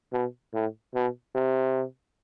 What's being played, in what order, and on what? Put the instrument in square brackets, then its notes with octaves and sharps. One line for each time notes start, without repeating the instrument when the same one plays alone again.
[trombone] B2
A2
B2
C3